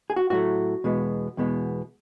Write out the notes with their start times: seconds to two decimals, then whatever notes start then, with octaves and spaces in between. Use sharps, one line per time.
0.10 G#4
0.16 F#4
0.30 A2 F#3 A3 F#4
0.84 E2 B2 G#3 B3
1.37 E2 B2 G#3 B3